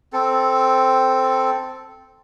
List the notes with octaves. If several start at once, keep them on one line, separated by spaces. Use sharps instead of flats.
C4 A4